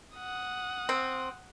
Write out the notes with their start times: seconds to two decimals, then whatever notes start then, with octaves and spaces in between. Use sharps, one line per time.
0.17 F#5 D#6
0.89 C4